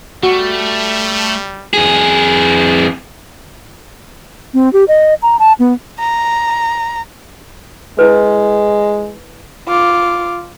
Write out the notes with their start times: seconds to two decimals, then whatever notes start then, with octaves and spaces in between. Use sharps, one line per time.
0.23 G3 A3 F#4
1.74 F2 G#4
4.54 C4
4.73 G4
4.88 D#5
5.22 A#5
5.39 A5
5.59 B3
6.00 A#5
7.99 G#3 E4 B4
9.68 F4 D6